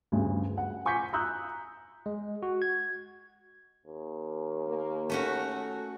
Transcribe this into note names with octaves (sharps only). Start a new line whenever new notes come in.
D2 G2 C#3
F#5
G#5 C#6 D6 G6 B6 C#7
A#5 D#6 E6 F#6 G6
G#3
F#4
G#6
D#2
A#3
A3 C#4 F#4 A4